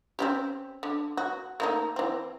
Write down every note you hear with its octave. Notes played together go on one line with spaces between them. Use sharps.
C4 C#4 G4
D3
F#4
A3 A#3 D#4
E3 C4